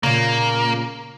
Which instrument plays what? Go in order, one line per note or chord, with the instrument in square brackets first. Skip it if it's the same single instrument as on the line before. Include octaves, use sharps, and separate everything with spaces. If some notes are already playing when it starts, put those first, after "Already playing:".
[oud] A#2 C#3 [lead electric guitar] A#3